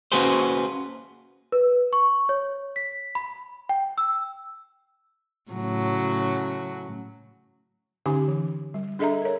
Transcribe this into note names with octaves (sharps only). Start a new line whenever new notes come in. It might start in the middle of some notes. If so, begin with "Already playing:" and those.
A#3 C#4 F#4 G#4 B4 C5
B4
C#6
C#5
B6
B5
G5
E6
A2 C#3 F#3
D3 C#4 D#4 G4 G#5 D6
E3
G3
D4 G#4 A4 D#5 E5 A#5
A#4 C#5